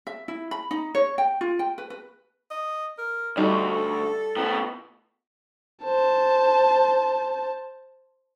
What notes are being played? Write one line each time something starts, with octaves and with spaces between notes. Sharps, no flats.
E5
E4
B5
D#4
C#5
G5
F4
G5
B4
B4
D#5
A#4
D2 G3 D#4 A4
A2 B3
C5 A5